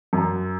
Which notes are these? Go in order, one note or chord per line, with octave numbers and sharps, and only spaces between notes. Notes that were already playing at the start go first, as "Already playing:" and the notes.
F#2